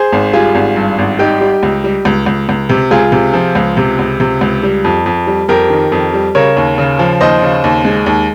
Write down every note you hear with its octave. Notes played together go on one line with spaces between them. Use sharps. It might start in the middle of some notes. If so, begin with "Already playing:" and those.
Already playing: G#4 C5
G#1
G3 F4 G#4
G#1
G2
G#1
G3 D#4 G4
G3
C#2
G3
C#2
C#2
C#2
C3
C#2 F4 G#4
C3
F3
C#2
C3
C#2
C3
C#2
G3
F2
F2
G3
F2 G4 A#4
D#3
F2
G3
C#3 A#4 C#5
D#2
C#3
F3
D#2 C5 D#5
C#3
D#2
G#3
D#2